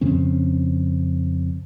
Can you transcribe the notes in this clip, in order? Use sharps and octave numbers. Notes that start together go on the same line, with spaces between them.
F2 C#3 C4 C#4